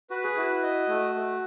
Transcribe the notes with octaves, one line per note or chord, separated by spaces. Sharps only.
F#4 B4
G#4
E4 F#4
D#5
A3
A3